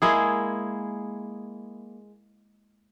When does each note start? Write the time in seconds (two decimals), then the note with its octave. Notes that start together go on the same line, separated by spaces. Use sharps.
0.02 G#3 A#3 E4 G#4